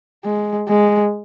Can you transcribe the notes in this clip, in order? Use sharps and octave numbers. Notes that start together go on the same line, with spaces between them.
G#3
G#3